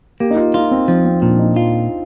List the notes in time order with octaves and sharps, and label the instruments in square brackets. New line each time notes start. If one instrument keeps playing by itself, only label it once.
[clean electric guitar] A#3 [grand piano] G4
[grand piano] D#4
F4
[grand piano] D#4 [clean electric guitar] F4
[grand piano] C4
[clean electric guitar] F3 [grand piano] C4
[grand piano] C4
[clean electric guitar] A#2 [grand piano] D4
[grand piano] D#4
[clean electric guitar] F4